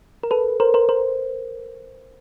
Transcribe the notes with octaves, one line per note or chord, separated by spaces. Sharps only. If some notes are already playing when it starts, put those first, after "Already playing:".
A#4
A4 B4
A#4 C5
A#4 C5
A#4 C5